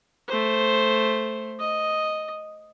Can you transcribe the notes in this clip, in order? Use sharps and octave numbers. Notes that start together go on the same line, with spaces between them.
A3 C5
D#5